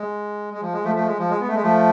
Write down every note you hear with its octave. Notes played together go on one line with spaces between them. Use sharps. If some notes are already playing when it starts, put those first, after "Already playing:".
Already playing: G#3
G#3
F3
G#3
F3 A3
F3 A3
G#3
F3
G#3
B3
A3
G#3
F3 A3